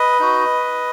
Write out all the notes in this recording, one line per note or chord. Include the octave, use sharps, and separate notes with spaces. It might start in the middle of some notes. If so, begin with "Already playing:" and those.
Already playing: B4 D#5
D#4 F#4